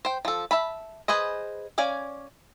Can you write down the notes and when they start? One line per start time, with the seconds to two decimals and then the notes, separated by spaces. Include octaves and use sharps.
0.05 C5 G5
0.25 F3 A4
0.51 E5 A5 B5
1.08 G#4 B4 C5 D#5
1.78 C#4 D5 F5 G#5